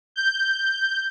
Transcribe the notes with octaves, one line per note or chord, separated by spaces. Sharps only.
G6